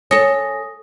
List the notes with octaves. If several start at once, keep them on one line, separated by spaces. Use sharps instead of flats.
A4 C#5 G#5 D#6 A#6